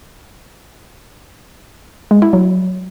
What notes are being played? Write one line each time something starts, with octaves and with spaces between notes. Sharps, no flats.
G#3
E4
F#3